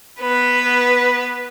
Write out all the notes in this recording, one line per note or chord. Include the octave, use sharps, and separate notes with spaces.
B3 B4